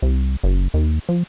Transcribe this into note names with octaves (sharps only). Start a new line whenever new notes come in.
C2
F#1
D#2
F3